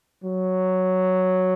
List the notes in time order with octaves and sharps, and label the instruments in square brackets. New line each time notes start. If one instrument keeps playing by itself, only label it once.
[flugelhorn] F#3